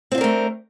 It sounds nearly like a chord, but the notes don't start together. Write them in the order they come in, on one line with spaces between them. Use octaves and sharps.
C4 F4 D4 A#4 A3